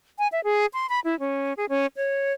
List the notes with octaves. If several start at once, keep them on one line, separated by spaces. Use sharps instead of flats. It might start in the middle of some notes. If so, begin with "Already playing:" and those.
G#5
E5
G#4
C6
B5
E4
C#4
G#4
C#4
C#5